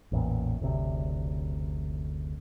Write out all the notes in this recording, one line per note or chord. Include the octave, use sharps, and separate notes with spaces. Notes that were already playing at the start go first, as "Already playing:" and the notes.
A1 E2 A#2
F#1 D2 C3